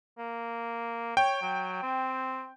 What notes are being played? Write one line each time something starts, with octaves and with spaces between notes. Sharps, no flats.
A#3
C#5 G5
F#3
C4